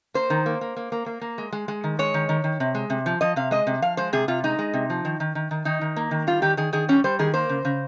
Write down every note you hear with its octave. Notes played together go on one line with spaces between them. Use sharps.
A#3 C5
D#3
A#3
A#3
A#3
A#3
A#3
A#3
G#3
G#3
G#3
D#3
G#3 C#5
D#3
D#3
D#3
C3
G#3
C3
F3
F3 D#5
C3 F5
G#3 D#5
C3
F3 F5
G#3 C5
C3 G#4
C3 F4
G#3 D#4
G#3
C3
F3
D#3
D#3
D#3
D#3
D#3 D#4
D#3
A#3
D#3
G3 F4
D#3 G4
D#3 G#4
D#3 G#4
G3 C#4
G3 C5
D#3 G#4
A#3 C5
C#3
C#3